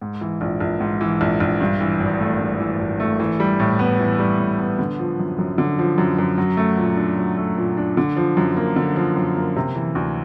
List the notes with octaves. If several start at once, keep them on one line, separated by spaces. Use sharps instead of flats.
G#2
E3
A#1
A#1
G#2
E3
A#1
A#1
G2
E3
G#1
A3
G2
E3
G#1
A3
E3
G3
A2
B3
E3
G3
A2
B3
D3
F3
F#2
F#2
D3
F3
F#2
F#2
F#3
A3
A#2
D4
F#3
A3
A#2
D4
D3
F3
F#2
A#3
D3
F3
F#2
A#3
C3
E3
D2